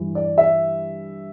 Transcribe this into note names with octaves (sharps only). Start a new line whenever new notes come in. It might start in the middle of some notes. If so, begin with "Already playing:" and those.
Already playing: G2 E3
D5
E5